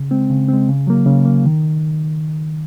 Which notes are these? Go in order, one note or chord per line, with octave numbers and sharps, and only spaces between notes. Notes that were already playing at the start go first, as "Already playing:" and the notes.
Already playing: C#3
G#3 C4
C#3
G#3 C4
C#3
F#3 A#3
C#3
F#3 A#3
D#3